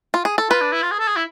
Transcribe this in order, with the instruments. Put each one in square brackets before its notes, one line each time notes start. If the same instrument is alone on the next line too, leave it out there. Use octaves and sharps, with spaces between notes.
[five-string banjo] F4
G#4
A4
[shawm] F4 [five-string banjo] B4
[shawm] D4
E4
F4
G#4
A4
G#4
E4